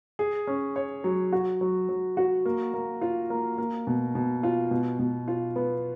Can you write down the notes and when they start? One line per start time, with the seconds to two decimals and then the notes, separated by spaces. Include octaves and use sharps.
0.19 G#4
0.47 C#4
0.76 C#5
1.04 F#3
1.32 F#4
1.61 F#3
1.89 F#3
2.17 F#4
2.45 A#3
2.74 A#3
3.01 F4
3.30 A#3
3.58 A#3
3.87 B2
4.15 B2
4.43 F4
4.71 B2
4.99 B2
5.28 F4
5.56 B3